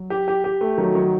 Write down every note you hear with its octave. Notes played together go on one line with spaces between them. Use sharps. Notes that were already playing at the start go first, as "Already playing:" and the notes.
Already playing: F#3
G4
G4
G4
A3
D#3 F#3
D#3